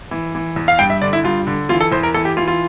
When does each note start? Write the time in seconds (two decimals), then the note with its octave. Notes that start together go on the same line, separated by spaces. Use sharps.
0.11 E3
0.35 E3
0.56 E2
0.68 F5
0.79 G2 G5
0.90 E5
1.01 D3 D5
1.13 E4
1.24 G2 F4
1.47 D3
1.69 E3 F4
1.81 A4
1.92 E2 C5
2.03 A#4
2.14 E3 A4
2.25 G4
2.37 E3 F4
2.48 F4